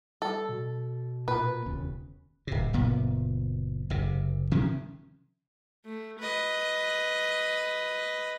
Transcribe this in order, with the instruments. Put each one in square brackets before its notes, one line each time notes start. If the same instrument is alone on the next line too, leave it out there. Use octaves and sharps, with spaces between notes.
[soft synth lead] G3 [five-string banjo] A4
[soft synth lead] B2
[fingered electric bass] A#2 [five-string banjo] B4
[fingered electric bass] E1 D#2 C#3
[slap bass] D1 C3
F#1 A#2 B3
F#1 C3
C3 D#3 F3 C#4
[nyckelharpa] A3
B4 D#5